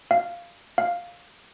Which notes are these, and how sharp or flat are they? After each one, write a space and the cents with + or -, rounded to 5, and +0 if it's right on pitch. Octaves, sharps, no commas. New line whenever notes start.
F5 -10
F5 +5